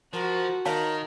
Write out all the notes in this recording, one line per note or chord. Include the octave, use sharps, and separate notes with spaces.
F3 F#4 A#4
D#3 A#4 C#5 F5 A5